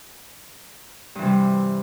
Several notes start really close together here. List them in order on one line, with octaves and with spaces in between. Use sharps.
G2 E3 C3 G3